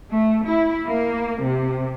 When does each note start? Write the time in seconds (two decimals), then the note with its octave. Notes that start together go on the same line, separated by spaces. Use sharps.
0.10 A3
0.46 E4
0.86 A#3
1.42 C3